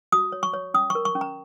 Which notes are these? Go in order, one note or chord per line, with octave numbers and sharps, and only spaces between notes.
F#4 D#6
C#5
C#6
C#5
C#4 D#6
C#6
A#4
C#6
C#4
A#5